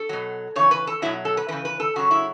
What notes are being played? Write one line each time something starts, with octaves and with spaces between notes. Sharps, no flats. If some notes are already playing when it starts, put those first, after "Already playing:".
Already playing: A4
B2 F#3
C#3 E3 C#5
B4
A4
B2 F#3 E4
A4
B4
C#3 E3 B4
B4
A4
C#3 F#3 F#4
E4